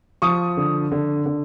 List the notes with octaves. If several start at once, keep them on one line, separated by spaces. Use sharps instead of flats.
F3 C#6 D#6
D3
D3
D3